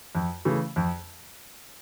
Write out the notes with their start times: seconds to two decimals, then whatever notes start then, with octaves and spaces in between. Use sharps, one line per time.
0.15 F2
0.45 C#3 E3 A3
0.76 F2